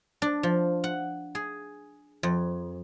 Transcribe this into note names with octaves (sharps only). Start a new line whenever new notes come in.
D4
F3
F#5
G#4
F2